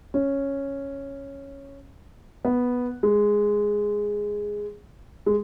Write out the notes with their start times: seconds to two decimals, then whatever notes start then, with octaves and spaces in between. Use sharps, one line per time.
0.14 C#4
2.45 B3
3.03 G#3
5.26 G#3